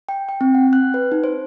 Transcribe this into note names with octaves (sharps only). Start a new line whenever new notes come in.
G5
G5
C4
F#5
F#6
B4
D#4
C5